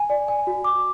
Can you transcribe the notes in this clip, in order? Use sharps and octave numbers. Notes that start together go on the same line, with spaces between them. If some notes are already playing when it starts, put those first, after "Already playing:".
Already playing: G#5
D5
G#5
F#4
D6